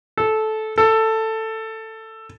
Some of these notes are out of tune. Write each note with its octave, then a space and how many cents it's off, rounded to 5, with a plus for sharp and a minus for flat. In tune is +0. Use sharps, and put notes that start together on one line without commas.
A4 -15
A4 +10